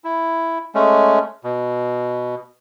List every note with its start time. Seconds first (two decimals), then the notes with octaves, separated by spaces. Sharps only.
0.04 E4
0.75 G#3 A3 C#4
1.44 B2